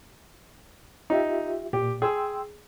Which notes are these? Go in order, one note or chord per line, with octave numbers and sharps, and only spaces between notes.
D#4 F4 G4 E5
A#2 G4
G#4 G5 C6 E6